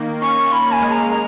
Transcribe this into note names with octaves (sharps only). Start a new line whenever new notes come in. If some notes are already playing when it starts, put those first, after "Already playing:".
Already playing: D#3 A#3
C#4 C#6
C#4 B5
G#5
G#3
A#5
G#3 A#5